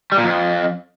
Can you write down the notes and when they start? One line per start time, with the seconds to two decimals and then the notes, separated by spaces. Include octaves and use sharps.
0.12 G3
0.18 A#2
0.24 F2